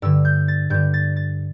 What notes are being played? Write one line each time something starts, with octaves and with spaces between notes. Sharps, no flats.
G2 D3 E6
G6
A6
G2 D3 G6
A6
A6